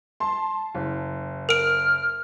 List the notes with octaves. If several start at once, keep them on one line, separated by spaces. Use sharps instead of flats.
A5 C6
F#1
A#4 F6 D7